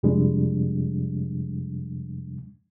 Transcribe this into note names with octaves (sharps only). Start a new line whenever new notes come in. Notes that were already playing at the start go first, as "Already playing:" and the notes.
F2 C3 F3 G3 G#3 D4